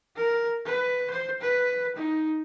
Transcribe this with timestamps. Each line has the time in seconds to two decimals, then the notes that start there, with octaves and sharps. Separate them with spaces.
0.16 A#4
0.66 B4
1.10 C5
1.41 B4
1.96 D#4